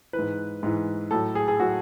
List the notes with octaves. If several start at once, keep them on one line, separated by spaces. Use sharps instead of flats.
E3 B4
G#2
G#2 E3
A2 F#3 A4
G#4
G#4
A2 F#3 F#4